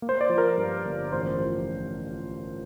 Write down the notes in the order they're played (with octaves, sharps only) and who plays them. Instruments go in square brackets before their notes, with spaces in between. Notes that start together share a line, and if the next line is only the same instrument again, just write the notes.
[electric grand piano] A#3
C5
D5
F3
A#4
G2
G1
A1 C5
F3